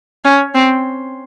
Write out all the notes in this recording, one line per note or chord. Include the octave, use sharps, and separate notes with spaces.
C#4
C4